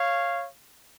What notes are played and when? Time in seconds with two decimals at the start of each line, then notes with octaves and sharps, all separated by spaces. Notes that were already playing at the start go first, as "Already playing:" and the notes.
Already playing: C#5 F5